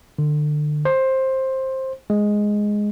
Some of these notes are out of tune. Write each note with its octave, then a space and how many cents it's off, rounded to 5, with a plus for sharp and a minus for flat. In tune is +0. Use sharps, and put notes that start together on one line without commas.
D3 +30
C5 +15
G#3 +0